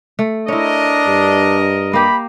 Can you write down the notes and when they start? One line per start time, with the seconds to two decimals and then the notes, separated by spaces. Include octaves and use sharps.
0.19 A3
0.48 D4 E4 A#4 C#5 D#5
1.07 G2
1.93 A#3 G4 B5